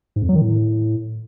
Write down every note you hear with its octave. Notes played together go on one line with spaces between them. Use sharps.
G#2
F2
F#3
D#3
A2